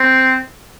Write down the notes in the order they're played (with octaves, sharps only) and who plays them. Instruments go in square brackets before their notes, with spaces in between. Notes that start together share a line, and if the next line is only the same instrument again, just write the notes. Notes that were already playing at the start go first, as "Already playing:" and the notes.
Already playing: [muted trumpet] C4